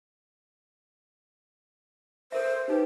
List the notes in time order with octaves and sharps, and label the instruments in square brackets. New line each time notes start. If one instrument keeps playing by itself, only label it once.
[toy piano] A4 A#4 E5 [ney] C5
[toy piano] C#4 D#4 B4 [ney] G4